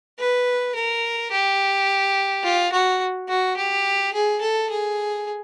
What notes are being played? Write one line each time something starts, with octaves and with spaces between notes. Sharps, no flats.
B4
A#4
G4
F4
F#4
F#4
G4
G#4
A4
G#4